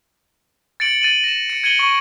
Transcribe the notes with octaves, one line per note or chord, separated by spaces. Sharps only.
A6 C#7 D7 F#7
A6 D#7 F#7
A#6 E7
C#7
G#6 C#7 D#7 F#7 G7
C#6 C#7